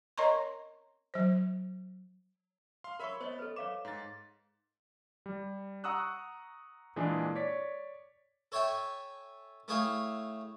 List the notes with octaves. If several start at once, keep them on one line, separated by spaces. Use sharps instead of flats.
A#4 C#5 D#5 A#5 C6 C#6
F#3 C5
F5 C6
A#4 C#5 E5 B5 C#6
B3 C5 C#5 D#5
A4 B4
C#5 F5 D6 E7
G#2 A6
G3
F#5 A#5 C#6 D#6 E6 F#6
A#2 E3 G#3 D4 G#4
C#5 D5 B6
A4 C#5 E5 G5 G#5
A3 E4 G#4 C#5 F5 G5